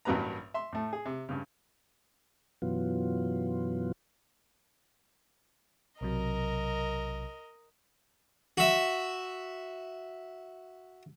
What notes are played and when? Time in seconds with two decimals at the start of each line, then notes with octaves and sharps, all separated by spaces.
0.05 A1 G2 F#3 A#3 B4 A#5
0.54 E5 C6
0.73 A2 A3
0.93 G#4
1.05 C3
1.29 G2 C#3
2.62 F#2 B2 E3 F#3 B3 F4
6.01 B1 C3 F#3 A#4 D#5
8.57 F#4 E5